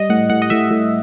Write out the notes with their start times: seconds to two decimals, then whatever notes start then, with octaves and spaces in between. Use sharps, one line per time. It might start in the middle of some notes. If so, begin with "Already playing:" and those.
Already playing: G3 D#5
0.10 A2 F#5
0.30 A2 F#5
0.42 D#5
0.50 A2 E5
0.71 A2